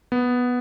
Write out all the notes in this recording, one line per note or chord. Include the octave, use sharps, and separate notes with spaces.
B3